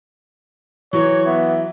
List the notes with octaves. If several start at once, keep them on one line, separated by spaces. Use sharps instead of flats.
E3 F#3 C#5
B3 E5